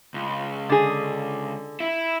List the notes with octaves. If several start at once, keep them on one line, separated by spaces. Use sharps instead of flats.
C#2
D3 G#4
E4